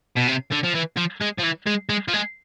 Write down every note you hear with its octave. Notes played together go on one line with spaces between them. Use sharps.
B2
C3
D3
F3
E3
F3
G#3
F3
E3
G#3
G#3
F3
G#3